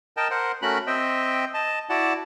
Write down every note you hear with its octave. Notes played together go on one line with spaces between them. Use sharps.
A#4 D#5 G5 A5
A#4 C5 F#5
A3 C#4 F#4 A#4 B5 F#6
C4 D#5 E5 G5
D#5 A5
E4 F#4 D5 F#5 A5